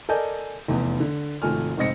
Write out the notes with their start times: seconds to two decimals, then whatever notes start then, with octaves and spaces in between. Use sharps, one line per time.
0.09 A4 A#4 D5 D#5 G#5 G6
0.68 F1 E2 B3
1.00 D3
1.42 G#1 C3 F3 A3 G#5 F6
1.77 F1 G#2 C4 D#5 A#6 C#7